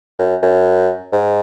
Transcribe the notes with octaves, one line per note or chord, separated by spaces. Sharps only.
F#2
F#2
G#2